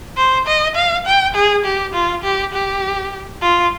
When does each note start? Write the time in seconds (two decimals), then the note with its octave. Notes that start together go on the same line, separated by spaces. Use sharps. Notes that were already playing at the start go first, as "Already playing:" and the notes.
0.17 C5
0.47 D#5
0.76 F5
1.06 G5
1.35 G#4
1.65 G4
1.94 F4
2.23 G4
2.53 G4
3.42 F4